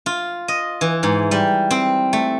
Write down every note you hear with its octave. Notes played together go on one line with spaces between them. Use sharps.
F4
D#5
E3
G#2
G3
C4
A3